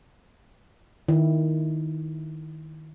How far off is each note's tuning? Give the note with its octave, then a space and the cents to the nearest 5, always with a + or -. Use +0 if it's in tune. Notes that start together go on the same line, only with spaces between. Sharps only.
D#3 +0 E4 +0